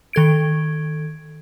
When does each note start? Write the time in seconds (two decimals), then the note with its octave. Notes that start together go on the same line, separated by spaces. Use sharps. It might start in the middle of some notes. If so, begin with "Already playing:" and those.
0.13 D#3 A4 G#6 D7